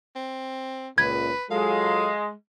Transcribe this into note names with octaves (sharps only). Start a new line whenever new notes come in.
C4
C#2 A#2 B4 G#6
F#3 G#3 F4 A4 F5